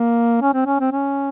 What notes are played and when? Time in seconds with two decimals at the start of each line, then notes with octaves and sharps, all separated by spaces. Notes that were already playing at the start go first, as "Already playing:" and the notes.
Already playing: A#3
0.42 C#4
0.54 C4
0.66 C#4
0.80 C4
0.92 C#4